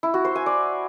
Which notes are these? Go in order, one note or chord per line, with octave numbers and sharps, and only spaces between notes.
E4
F#4
C5
G#5
D5